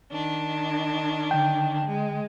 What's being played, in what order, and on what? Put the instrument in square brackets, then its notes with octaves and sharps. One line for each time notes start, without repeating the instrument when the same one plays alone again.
[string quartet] D#3 D4
[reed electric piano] D3 G5
[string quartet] G#3